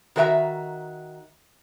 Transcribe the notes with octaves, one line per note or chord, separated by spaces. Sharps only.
D#3 F#4 A#4 D5 E5 A#5